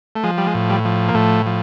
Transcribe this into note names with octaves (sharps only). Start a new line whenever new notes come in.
A3
F3 G#3
G3
G#3
A2
G3
F3
A#3
A2 A3
F3